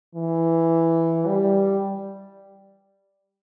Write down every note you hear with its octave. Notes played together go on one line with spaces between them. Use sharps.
E3
G3